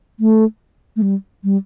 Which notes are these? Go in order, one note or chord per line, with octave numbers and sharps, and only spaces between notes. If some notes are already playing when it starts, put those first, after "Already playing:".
A3
A3
G3
G3